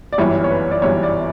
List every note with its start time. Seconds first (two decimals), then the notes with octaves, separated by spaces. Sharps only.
0.13 D5
0.18 G1 F#2 E3 G3 C#5
0.44 C#5
0.50 B4
0.71 D5
0.82 G1 F#2 E3 G3 C#5
1.03 D5